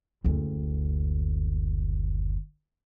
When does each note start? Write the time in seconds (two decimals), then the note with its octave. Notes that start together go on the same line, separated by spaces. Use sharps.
0.24 F#1 D2